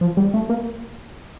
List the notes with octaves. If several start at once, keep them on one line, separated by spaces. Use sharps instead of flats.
F3
G3
A3
A#3